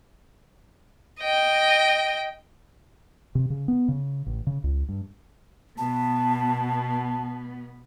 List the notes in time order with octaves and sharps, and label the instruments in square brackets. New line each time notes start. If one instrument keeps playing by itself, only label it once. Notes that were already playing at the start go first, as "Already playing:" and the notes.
[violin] D#5 G5
[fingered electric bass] C3
C#3
B3
C#3
A1
C#3
C#2
G2
[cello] B2 B3 [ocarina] A5